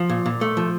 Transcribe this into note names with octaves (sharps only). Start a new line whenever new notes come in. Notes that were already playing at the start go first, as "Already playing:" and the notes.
Already playing: F3
A#2
A#2
A3
F3